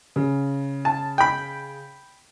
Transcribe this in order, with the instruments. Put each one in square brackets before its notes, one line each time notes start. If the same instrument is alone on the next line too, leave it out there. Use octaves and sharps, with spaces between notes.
[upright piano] C#3
[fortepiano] A5
G5 B5